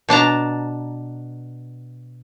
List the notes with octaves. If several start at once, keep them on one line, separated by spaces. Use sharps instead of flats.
B2 D4 A5 A#5